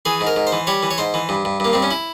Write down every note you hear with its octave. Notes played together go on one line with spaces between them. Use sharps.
E3 G#4
G#2
A#4
G#2
C5
E3
G3 C#5
E3
C#5
G#2 C5
E3
G2
G2
G2 A#3
G2 C4
C#4
E4